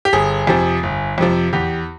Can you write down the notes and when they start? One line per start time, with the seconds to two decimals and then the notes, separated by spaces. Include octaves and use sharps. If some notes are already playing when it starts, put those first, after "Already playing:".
0.05 G4
0.13 G1 G#4
0.47 F2 C3 F3
0.83 G1
1.18 F2 C3 F3
1.53 E2 G4